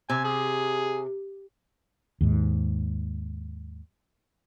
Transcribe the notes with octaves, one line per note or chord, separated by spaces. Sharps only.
C3 G#5
G#4
D#2 G#2